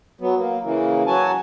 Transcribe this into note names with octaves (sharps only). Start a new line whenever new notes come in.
F#3 B3
A#3
C#3 E3 A#3
F#3 F#4 G#5 A5